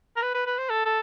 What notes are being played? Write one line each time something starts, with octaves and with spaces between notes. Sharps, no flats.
A#4
B4
B4
B4
C5
A4
A4